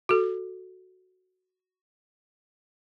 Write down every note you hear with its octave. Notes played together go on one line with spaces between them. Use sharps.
F#4 A4